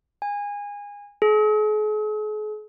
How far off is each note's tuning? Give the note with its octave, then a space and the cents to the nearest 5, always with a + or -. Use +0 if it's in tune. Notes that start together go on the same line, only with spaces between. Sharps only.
G#5 -25
G#4 +45